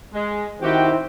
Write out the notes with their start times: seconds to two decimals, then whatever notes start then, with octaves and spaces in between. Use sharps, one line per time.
0.14 G#3
0.62 D#3 C4 E4 F#4 G4 G5